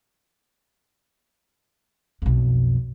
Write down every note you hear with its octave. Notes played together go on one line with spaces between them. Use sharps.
B1 F2